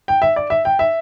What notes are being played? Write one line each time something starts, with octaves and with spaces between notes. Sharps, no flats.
G5
E5
D5
E5
G5
E5